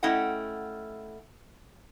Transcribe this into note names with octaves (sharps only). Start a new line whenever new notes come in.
A3 C#4 E4 D#5 F#5 G5